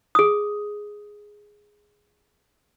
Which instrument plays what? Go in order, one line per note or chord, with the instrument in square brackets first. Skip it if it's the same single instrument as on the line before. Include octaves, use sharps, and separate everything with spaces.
[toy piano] G#4 D#6